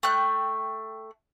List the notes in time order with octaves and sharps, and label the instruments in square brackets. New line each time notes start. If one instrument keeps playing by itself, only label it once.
[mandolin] A3 G5 F#6